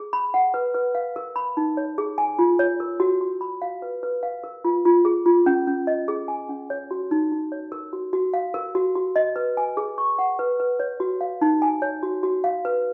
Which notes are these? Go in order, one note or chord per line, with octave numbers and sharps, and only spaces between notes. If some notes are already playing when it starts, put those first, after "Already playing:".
Already playing: G#4
B5
F#5
B4
B4
F5
A#4
B5
D#4
C#5
G#4
G#5
F4
C#5
A#4
F#4
F#4
B5
F5
B4
B4
F5
A#4
F4
F4
G#4
F4
C#4
C#4
D#5
G#4
G#5
C#4
C#5
F#4
D#4
D#4
C#5
A#4
F#4
F#4
F5
A#4
F#4
F#4
D#5
B4
G#5
G#4
C#6
F#5
B4
B4
C#5
F#4
F5
D#4
G#5
C#5
F#4
F#4
F5
B4